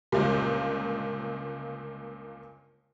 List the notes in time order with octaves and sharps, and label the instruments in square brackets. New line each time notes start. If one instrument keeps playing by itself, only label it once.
[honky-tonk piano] G1 C#2 A#2